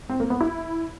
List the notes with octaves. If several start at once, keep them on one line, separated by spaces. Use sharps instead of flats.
C4
A#3
B3
E4